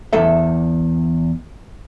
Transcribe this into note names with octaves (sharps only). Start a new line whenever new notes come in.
E2 A4 E5